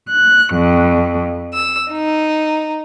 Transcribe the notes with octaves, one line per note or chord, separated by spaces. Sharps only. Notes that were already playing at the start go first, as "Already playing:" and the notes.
F#6
F2
E6
D#4